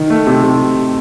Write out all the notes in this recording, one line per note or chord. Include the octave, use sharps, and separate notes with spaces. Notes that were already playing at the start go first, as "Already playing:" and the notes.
Already playing: D#3
A3
C3
C3